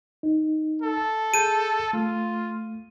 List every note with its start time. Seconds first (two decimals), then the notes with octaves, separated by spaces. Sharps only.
0.23 D#4
0.82 A4
1.34 G#4 A5 G6 D#7
1.93 A3 F4